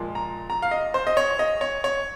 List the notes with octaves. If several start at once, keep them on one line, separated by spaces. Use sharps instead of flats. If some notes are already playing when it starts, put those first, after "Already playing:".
Already playing: A#2 F3 G#3
A#5
A#5
F5
D#5
C5
D#5
C#5
D#5
C#5
C#5